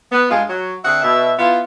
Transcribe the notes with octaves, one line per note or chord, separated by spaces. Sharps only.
B3
G2 G#3 F4
F#3
D3 C4 G#4 E5 F#5
B2 E5
B3 E4 F4